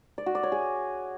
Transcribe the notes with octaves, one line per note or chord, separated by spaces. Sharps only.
D5
F#4
D5
C#5
G#4